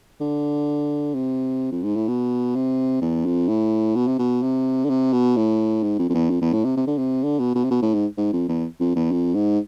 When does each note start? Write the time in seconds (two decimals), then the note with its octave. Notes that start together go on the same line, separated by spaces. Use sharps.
0.20 D3
1.14 C3
1.72 F2
1.83 G#2
1.96 A2
2.08 B2
2.55 C3
3.02 E2
3.25 F2
3.48 A2
3.96 B2
4.07 C3
4.19 B2
4.42 C3
4.85 D3
4.90 C3
5.13 B2
5.36 A2
5.83 G#2
5.99 F2
6.10 F2
6.14 E2
6.30 F2
6.42 E2
6.53 A2
6.65 C3
6.77 C3
6.87 D3
6.98 C3
7.24 D3
7.39 B2
7.55 B2
7.64 C3
7.71 B2
7.82 A2
7.94 G#2
8.17 G#2
8.33 F2
8.49 E2
8.80 F2
8.96 E2
9.12 F2
9.34 G#2